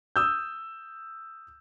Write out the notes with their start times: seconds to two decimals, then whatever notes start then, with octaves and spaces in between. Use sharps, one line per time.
0.16 D#6 E6 G6